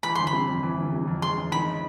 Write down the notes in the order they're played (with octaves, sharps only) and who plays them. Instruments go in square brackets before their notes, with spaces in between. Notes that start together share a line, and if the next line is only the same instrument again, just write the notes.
[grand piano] E3 [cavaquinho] B5
[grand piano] G1 [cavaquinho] C6
[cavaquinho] B5
[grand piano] C3
F2
E3
G1
C3
F2
[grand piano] G#3 [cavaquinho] C6
[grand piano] A1
[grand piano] D#3 [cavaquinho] B5